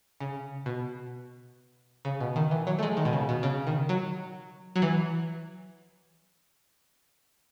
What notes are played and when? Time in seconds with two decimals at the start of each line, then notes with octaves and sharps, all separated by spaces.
0.21 C#3
0.66 B2
2.05 C#3
2.20 B2
2.36 D#3
2.51 E3
2.67 F#3
2.79 A3
2.83 G#3
2.97 D#3
3.05 B2
3.13 C#3
3.29 B2
3.43 C#3
3.67 D#3
3.89 F#3
4.76 F#3
4.82 E3